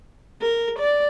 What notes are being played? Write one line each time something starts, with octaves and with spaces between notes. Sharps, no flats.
A#4
D5